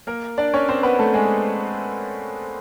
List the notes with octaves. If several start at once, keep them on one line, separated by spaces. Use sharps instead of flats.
A#3 A#4
D4 D5
C#4 C#5
C4 C5
B3 B4
A3 A4
G#3 G#4